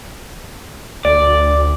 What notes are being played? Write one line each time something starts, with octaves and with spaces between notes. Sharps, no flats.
D2 D5